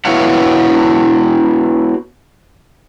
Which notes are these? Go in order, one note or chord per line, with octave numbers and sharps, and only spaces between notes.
B3 E4 F#4 C#5 F5 F#5